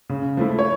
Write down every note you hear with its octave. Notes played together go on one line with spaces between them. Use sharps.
C#3
F3 A3 E4
C#5